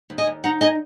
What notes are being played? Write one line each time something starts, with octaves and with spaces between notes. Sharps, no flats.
D#2
D#5 G#5
D#2
D#4 F#5 A#5
D#4 D#5 G#5